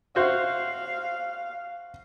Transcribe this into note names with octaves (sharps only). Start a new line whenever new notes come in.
F#4 C5 E5 F5